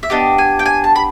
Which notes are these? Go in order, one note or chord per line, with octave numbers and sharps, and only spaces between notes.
E5
B3 D4 G4 D#5
G#5
G5
G#5
A5
B5